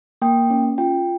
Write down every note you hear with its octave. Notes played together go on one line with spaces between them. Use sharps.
A#3 G5
C#4
F4 G5